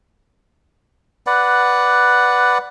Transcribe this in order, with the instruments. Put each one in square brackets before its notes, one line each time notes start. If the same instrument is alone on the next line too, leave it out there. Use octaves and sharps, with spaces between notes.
[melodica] B4 D5 F#5